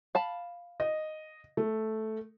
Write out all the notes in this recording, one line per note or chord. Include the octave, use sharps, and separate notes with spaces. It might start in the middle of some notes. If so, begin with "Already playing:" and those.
F5 A5 B5
D#5
A3